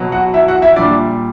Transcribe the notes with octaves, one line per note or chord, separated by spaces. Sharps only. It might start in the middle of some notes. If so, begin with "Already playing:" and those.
Already playing: B2 F#3
F#4 F#5
E4 E5
F#4 F#5
E4 E5
A#2 G3 D4 D5